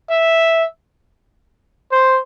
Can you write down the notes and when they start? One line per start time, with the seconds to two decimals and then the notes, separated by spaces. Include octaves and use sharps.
0.10 E5
1.92 C5